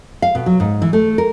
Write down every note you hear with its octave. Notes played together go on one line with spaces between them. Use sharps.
F5
B2
F#3
G#2
E3
A3
A#4